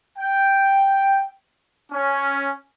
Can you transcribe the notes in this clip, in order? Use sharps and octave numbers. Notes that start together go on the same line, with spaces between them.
G5
C#4